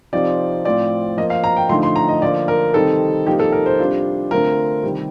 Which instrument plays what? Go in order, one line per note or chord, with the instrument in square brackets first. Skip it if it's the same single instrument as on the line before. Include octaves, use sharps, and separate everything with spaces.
[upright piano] C3 F3 C4 D#4 D5
A2 F3 C4 D5
F3 A#3 F4 D#5
F5
A#5
G5
D3 F3 A3 D#4 C6
C6
A#5
D#5
D3 F3 A#3 D5
A#4
C3 D#3 G3 C4 D#4 A4
C3 F3 A#3 D#4 G4
A4
A#4
C5
C3 G3 D4 F4
D3 A3 C4 F4 A#4
C3 D#3 G3